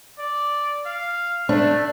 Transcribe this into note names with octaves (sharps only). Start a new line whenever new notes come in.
D5
F5
A3 D4